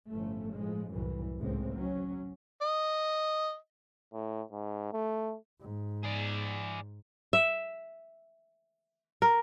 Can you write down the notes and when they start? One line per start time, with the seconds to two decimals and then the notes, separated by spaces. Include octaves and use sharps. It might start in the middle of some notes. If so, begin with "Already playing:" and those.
0.12 G1 A2 F3 A3 C#4
0.54 A2 F3 G#3
0.93 C2 F#2 A2 E3
1.39 G#1 C#2 A2 G#3 C4
1.76 F#3 C#4
2.62 D#5
4.13 A2
4.52 G#2
4.93 A3
5.60 G#2
6.03 G#4 D5
7.33 E5
9.22 A#4